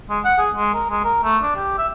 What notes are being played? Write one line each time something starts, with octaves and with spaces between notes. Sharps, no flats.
G#3
F#5
G#4
G#3
A#4
G#3
A#4
A3
D4
G4
E5